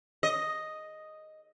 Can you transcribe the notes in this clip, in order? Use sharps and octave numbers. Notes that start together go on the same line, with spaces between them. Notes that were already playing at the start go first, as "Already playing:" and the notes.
D#5